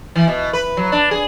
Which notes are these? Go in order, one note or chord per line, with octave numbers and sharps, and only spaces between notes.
E3
B2
B4
F#3
D4
G#4